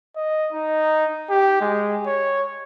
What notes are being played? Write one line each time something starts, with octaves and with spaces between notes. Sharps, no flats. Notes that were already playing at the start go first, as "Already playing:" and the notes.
D#5
D#4
G4
G#3
C#5